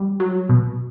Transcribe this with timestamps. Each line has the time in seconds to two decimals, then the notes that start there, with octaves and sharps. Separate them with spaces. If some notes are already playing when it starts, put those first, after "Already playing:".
Already playing: G3
0.20 F#3
0.49 B2